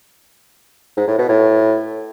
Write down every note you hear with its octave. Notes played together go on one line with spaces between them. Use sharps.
G#2
A2
B2
A2